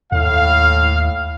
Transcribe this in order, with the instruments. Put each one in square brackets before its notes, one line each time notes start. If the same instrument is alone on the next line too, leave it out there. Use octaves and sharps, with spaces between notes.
[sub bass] D#2 [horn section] A2 F5